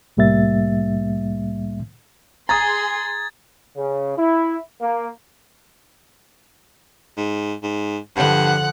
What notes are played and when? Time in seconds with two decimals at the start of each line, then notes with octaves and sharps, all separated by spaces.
0.17 C2 A2 G3 A#3 E5 A6
2.49 G#4 G#5 A#5 C6 D#6 G#6 A6
3.77 C#3
4.18 E4
4.81 A#3
7.17 G#2
7.63 G#2
8.16 G2 D3 F3 F#5 F#6